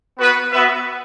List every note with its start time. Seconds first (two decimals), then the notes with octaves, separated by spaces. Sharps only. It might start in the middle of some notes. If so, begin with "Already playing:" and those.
0.18 B3 F#4 B4
0.52 B3 F#4 B4 E5